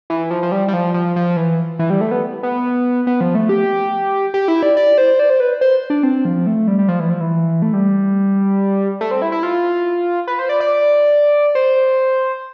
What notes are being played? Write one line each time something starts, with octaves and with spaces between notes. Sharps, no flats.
E3
F3
F3
G3
G3
F3
F3
F3
E3
E3
G3
A3
B3
B3
B3
F3
A3
G4
G4
E4
D5
D5
C5
D5
C5
B4
C5
D4
C4
F3
A3
G3
G3
F3
E3
F3
E3
A3
G3
A3
C4
E4
E4
F4
B4
C5
D5
D5
C5